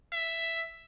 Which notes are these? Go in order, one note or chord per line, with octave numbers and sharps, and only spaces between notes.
E5